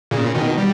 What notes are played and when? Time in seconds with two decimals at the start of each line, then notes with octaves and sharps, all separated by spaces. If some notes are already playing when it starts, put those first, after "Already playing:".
0.11 A#2 C#3
0.35 B2 D#3
0.58 G3